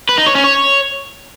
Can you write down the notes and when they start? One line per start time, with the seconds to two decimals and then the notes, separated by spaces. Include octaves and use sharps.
0.09 B4
0.18 D#4
0.26 C#5
0.35 C#4
0.44 C#5